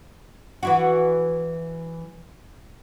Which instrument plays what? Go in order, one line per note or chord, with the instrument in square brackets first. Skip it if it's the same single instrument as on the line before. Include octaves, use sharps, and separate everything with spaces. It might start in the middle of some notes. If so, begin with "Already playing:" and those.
[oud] E3 E4 F#4